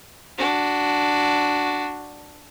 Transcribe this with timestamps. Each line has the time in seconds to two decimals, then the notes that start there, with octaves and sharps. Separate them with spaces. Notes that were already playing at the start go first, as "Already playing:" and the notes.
0.38 D4 F#4